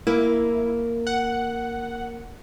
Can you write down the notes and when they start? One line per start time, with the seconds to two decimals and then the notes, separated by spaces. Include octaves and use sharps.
0.07 A#3 E4
1.07 F#5